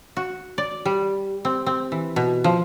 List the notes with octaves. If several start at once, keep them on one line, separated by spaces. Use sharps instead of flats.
F#4
D5
G3
C4
C4
E3
B2
F3